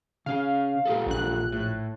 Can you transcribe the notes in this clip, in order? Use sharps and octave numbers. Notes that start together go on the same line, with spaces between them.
C#3 C#4 F5
A#2 G4 A4
A#1 F#6
A2